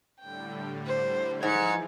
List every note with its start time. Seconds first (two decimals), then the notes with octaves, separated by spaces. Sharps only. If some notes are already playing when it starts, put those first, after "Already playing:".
0.20 A2 D3 G3 G5
0.86 C5
1.43 G#2 E3 F3 G#6 C#7